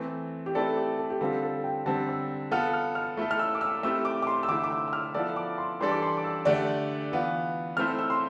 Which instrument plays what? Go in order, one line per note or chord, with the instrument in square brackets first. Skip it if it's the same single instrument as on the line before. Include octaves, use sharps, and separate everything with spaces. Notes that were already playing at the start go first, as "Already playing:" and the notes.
Already playing: [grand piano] E3 A3 C4
[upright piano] G4
[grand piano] A3 C4 E4 B4 D5 [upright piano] A4
[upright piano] G4
A4
G4
[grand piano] D3 G3 C4 F4 [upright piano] A4
[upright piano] A4
G5
[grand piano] D3 G3 C4 [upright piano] A5
[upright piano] E6
[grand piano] B3 F4 A4 [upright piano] F6
[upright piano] F6
F6
[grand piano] A3 E4 A4
[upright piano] F6
E6
D6
E6
[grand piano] A3 C4 E4 G4 [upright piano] E6
[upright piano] D6
D6
C6
E6
[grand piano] D3 A3 E4 [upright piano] D6
[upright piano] D6
E6
E6
F6
[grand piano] F3 B3 E4 A4 D5 [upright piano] E6
[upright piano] D6
C6
[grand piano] E3 G3 D4 A4 D5 [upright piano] C6
[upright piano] D6
C6
D6
E6
[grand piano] D3 A3 D4 G4 D5
E3 B3 F4
[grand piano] A3 C4 E4 A4 C5 [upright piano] F6
[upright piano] E6
C6